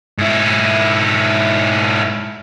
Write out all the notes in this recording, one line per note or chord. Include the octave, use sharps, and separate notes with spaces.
G#2 E4